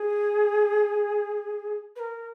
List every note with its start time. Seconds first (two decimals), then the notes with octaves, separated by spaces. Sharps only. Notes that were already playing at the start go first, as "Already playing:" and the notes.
Already playing: G#4
1.96 B4
2.00 A#4